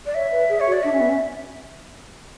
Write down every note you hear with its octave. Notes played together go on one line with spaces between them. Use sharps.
D5
C#5 E5
B4
G#4
C#5
F#4
D5
D4 E5
C#4
B3
C#4